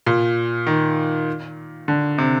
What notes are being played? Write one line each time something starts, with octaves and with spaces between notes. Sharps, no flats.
A#2
D#3
D3
C3